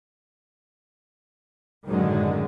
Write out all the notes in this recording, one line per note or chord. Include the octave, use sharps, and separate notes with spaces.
F#2 A2 D3 D#3 F#3 G#3